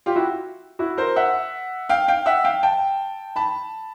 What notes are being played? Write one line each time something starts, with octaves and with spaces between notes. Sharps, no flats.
F4 G4
E4 F#4
E4 F#4
A#4 C5
E5 F#5
F5 G5
F5 G5
E5 F#5
F5 G5
G5 A5
A5 B5